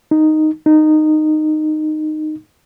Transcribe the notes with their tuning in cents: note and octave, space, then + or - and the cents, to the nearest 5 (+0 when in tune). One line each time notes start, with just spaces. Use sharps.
D#4 -5
D#4 -15